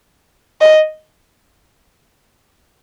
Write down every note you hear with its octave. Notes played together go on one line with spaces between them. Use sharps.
D#5